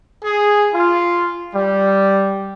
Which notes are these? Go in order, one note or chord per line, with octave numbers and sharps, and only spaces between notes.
G#4
F4
G3